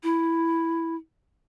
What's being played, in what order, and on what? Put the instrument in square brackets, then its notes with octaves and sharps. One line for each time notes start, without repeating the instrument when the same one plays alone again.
[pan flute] E4